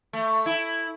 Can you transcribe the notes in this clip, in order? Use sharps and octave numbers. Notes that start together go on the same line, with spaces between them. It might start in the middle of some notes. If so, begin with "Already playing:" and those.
A3
E4